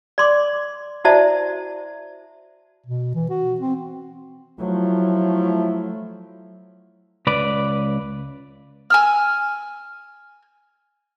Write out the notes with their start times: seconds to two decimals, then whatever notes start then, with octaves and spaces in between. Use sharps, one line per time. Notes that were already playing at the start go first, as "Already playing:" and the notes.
0.18 D5 C6 D6
1.05 E4 F#4 C5 D5 E5 A5
2.87 B2
3.15 E3
3.30 F#4
3.61 C4
4.59 F3 F#3 A3 E4
7.27 C#2 B4 D5
8.90 G#5 E6 F6